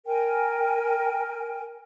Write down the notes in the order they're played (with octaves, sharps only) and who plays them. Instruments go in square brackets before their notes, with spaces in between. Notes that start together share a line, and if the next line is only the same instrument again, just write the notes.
[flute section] A#4 G5 G#5